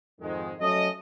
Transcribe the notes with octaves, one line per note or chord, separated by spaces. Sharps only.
F2 G#2 D#3 G#3
F#3 A3 C#4 A4 D#5